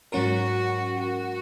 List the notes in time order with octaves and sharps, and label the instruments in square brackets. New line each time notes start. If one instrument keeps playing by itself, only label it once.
[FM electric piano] G#2 F#3 C#4 A#4 [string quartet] F#4
[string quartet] F#4